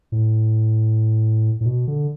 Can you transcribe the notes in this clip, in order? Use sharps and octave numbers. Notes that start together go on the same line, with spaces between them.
A2
A2
B2
D3